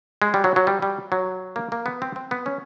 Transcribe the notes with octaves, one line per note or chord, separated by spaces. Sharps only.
G#3
G3
F#3
F#3
G3
G3
F#3
A#3
A#3
B3
C4
C4
B3
C#4